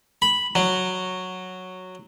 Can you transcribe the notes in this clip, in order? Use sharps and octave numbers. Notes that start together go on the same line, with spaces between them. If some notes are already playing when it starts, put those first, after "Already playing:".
B5
F#3